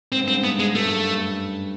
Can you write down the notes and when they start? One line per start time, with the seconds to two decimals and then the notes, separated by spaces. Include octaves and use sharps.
0.12 G#2 C4
0.24 G2
0.28 G#2 C4
0.44 G2 B3
0.59 G#2 G#3
0.75 G2 A3
0.86 F#2
0.96 G2
1.07 G2